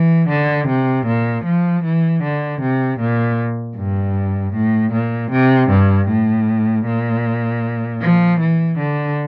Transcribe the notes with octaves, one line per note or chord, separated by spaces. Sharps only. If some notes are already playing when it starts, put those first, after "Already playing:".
Already playing: E3
D3
C3
A#2
F3
E3
D3
C3
A#2
G2
A2
A#2
C3
G2
A2
A#2
F3
E3
D3